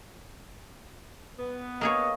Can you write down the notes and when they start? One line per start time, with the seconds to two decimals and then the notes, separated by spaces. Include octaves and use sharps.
1.39 B3
1.81 A#3 G#4 C#5 D#5